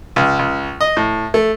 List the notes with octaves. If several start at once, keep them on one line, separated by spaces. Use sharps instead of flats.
C#2
C#2
D#5
A2
A3